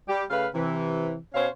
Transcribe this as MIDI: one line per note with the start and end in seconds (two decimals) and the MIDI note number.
0.08 0.23 55
0.08 0.23 67
0.30 0.47 49
0.30 0.47 57
0.30 0.47 71
0.30 0.47 77
0.54 1.16 48
0.54 1.16 52
1.34 1.47 47
1.34 1.47 61
1.34 1.47 72
1.34 1.47 73
1.34 1.47 77